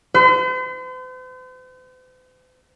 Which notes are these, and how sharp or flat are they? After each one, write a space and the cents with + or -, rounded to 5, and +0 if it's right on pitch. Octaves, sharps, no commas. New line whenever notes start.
C5 -45